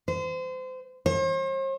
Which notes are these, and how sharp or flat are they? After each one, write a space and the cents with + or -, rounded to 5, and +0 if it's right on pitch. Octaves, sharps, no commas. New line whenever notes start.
C5 -30
C5 +45